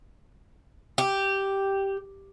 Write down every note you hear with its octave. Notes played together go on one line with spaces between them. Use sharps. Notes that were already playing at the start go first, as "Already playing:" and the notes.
G4